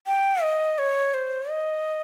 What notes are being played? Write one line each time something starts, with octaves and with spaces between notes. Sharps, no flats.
G5
D#5
C#5
C5
D#5